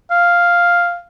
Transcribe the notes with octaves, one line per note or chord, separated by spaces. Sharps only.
F5